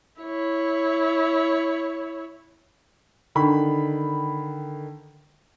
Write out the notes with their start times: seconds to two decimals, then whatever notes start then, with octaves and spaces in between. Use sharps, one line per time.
0.21 E4 C#5
3.35 D3 D#3 B5